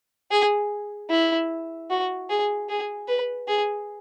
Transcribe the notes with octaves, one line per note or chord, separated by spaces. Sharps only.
G#4
E4
F#4
G#4
G#4
B4
G#4